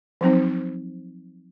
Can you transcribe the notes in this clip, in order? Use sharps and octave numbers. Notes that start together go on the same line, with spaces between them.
F3 F#3 C4 D#4